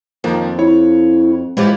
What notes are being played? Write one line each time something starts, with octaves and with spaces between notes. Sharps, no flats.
F2 D#3 F3 A#3
E4 C#5
E3 F3 G#3 G4